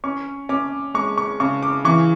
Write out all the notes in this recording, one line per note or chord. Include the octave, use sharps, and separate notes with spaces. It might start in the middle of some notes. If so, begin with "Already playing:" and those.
C#4 C#6
C#4 D6
G#3 C#6
C#6
C#3 C#6
D6
E3 C#6